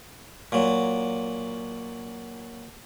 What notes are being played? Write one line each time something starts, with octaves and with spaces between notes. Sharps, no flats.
A#2 F#3